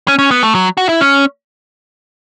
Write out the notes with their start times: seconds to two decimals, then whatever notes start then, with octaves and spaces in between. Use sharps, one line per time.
0.08 C#4
0.19 C#4
0.31 B3
0.43 A3
0.55 F#3
0.77 F#4
0.89 E4
1.01 C#4